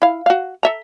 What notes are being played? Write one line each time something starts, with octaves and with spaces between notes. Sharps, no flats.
E4 F5
F#4 F5
A4 E5 A#5